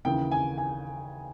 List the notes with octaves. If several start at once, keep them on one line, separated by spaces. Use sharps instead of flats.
D#2 C#3 E3 G5
G#5
G#5